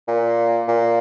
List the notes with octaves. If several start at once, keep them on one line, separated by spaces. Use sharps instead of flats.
A#2
A#2